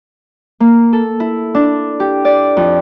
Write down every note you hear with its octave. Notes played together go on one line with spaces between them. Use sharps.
A#3
A4
E4
D4
G4
D5
F2